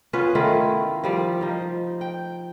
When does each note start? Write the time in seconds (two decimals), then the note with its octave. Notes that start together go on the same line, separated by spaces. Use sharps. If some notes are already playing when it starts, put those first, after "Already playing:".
0.13 B3 C#4 F4 B4
0.35 D#3 A3 E4 F4
1.04 F3 G3 D5
1.41 F3 D#4
2.01 G5